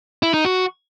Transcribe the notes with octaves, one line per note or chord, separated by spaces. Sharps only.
E4
D#4
F#4